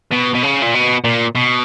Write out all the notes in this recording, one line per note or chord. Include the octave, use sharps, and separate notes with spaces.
B2
B2
C#3
A#2
B2
A#2
B2